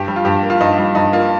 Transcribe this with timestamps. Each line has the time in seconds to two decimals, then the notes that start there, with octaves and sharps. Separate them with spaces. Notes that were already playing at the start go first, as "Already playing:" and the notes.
Already playing: G2 G4
0.08 G3
0.16 F4
0.25 G2 G4
0.43 A#3
0.50 F4
0.60 G2 D#4
0.78 G3 F4
0.95 G2 D#4
1.13 A#3 F4